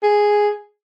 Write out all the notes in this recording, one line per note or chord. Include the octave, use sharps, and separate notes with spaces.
G#4